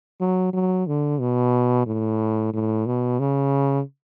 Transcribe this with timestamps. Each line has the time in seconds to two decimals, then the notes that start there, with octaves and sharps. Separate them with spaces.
0.20 F#3
0.53 F#3
0.87 D3
1.20 B2
1.86 A2
2.53 A2
2.86 B2
3.19 C#3